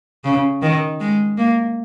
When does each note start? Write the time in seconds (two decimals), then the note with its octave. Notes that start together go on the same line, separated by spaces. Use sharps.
0.24 C#3
0.62 D#3
1.00 G#3
1.38 A#3